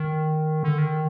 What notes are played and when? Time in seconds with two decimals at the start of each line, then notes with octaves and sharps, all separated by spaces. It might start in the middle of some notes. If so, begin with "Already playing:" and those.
Already playing: D#3
0.63 D3
0.78 D#3